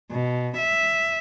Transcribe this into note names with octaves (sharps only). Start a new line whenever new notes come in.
B2
E5